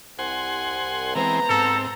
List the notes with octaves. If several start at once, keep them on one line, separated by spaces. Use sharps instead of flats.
C2 F#5 G#5 C6
E3 G#3 B3 C4 C5 A#5
G#2 C4 A4